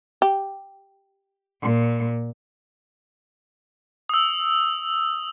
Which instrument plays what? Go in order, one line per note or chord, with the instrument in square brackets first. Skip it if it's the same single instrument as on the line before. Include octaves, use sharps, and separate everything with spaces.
[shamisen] G4
[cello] A#2
[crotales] D#6 E6